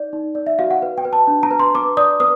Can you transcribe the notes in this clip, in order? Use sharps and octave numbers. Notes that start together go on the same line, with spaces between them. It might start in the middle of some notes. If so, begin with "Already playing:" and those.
Already playing: D#4 D5
D#4
D5
E5
F#4 F5
F#5
B4
G5
B4
A5
D4
A#5
B4
C6
B4 D6
D5 D#6
B4 D#6